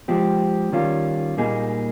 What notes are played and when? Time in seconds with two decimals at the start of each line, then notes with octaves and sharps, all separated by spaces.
0.08 F3 G#3 C4 G4
0.73 D#3 G3 C#4 F4
1.37 A#2 G3 A#3 D#4 G#4